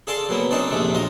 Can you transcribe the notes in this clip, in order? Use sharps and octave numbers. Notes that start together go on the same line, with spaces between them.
G#4 A4 D5 F5 A5 C6
F#3 A#3 B3
C4 D4 D#4 A4 C5 D5
A#1 D#2 G#3 A3 D4
F#3 F4 D#5